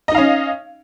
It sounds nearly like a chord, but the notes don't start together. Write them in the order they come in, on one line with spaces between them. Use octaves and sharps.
D#5 D#4 F5 C#4